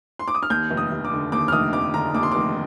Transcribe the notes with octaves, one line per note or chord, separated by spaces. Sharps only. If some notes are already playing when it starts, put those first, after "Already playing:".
C6
D6
D#6
F6
D#2 G6
F1
D#6
F1
D6
D3
D#2 D6
F6
F1 D#6
F1 D6
D3 A#5
D#2 D6
C6
F1 D6